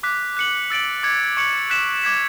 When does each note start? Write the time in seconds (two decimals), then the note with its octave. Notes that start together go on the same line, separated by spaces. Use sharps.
0.03 D6 F#6 B6
0.37 F#6 C#7 F#7
0.70 E6 A6 D7 F#7
1.03 D6 G#6 C#7 F#7
1.37 C#6 G#6 C#7 F#7
1.70 F#6 B6 E7
2.04 D6 G#6 B6